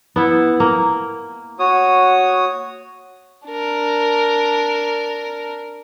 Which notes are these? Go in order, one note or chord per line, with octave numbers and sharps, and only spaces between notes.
B3 E4 F#5
A#3
F#4 C#5 D#6
D4 A#4